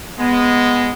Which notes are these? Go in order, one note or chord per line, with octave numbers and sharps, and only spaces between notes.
G#3 B3